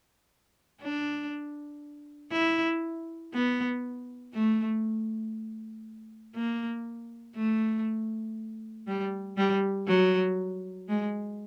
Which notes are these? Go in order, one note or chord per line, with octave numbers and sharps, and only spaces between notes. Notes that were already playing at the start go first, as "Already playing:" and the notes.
D4
E4
B3
A3
A#3
A3
G3
G3
F#3
G#3